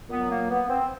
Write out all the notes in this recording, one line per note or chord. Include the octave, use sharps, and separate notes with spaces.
A#2 F#3 B3
A#3
B3
C4